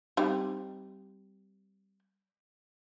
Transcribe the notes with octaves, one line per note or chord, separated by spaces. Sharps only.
G3 C4 D#4